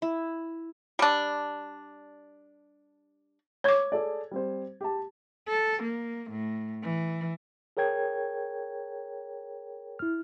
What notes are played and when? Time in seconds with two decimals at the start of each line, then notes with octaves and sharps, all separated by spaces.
0.02 E4
0.99 G3 D4
3.64 C#5 C#6 D6 G#6
3.92 G#4 A4 D5
4.31 G3 C4 C5
4.81 G4 A5
5.47 A4
5.83 A#3
6.30 A2
6.83 E3
7.77 G#4 A#4 C#5 G5 G#6
9.99 E4 F6